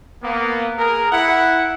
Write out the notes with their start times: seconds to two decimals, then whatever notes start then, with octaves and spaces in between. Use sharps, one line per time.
0.24 A#3 B3
0.78 G#4 A#4
1.11 E4 F#5